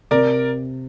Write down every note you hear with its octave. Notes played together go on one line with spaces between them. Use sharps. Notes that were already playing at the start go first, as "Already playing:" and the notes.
C3 A#4 D5